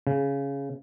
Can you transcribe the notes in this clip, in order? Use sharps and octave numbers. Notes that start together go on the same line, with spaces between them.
C#3